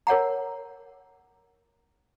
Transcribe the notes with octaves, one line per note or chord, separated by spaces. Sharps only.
A#4 C#5 F#5 A#5